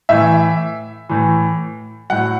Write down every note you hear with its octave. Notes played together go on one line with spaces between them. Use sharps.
A2 E3 E5
A2 E3
A2 F#3 F#5